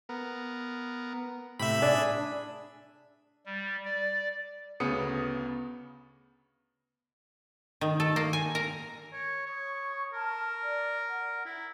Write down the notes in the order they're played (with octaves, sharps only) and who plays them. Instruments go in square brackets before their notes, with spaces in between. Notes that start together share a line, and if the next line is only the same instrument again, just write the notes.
[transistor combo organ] B3 A#4
[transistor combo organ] A2 C3 [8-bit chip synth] E5 B5
[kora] D4 [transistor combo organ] G#4
[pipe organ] G3
D5
[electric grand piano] D2 C#3 B3 D#6 C#7
[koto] D#3
A4
A#3
G#5
A#4
[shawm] C#5
[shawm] C#5 [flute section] C#6 D#6
[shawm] A#4 [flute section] A5 F6
[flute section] D5
F#5
[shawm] E4